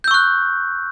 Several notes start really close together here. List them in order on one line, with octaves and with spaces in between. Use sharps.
G6 E6 C#6 F#6